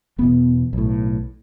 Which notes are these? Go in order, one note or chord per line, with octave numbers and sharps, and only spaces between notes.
E1 E2 B2 B3
B1 A2